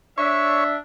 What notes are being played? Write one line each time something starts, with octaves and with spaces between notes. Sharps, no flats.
D4 C#5 E5 C#6